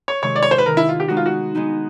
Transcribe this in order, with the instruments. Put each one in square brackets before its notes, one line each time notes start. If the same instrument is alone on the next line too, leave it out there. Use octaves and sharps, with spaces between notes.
[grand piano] C#5
[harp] C3 D#3 G#3 [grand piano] C#5
[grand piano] D5
C#5
C5
B4
[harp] C3 D#3 G#3 [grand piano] A#4
[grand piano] E4
F4
G4
[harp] G#3 B3 D#4 [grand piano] F#4
[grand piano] F4
F#4
[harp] G#3 B3 D#4